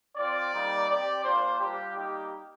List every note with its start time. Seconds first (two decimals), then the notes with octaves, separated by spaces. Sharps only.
0.18 C4 F4 D5
0.53 G3 A#3 D#4
0.89 C4 G4 D5
1.25 A#3 D4 F4 C5
1.60 G3 D4 F4 G4
1.96 G3 A#3 D#4 G4